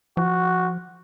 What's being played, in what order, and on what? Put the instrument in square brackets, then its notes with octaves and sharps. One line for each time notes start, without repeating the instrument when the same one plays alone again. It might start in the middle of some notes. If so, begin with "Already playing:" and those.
[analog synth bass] F3 [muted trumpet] F#4